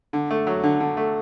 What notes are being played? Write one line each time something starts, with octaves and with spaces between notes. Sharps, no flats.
D3
A3
F#3
D3
D3
A3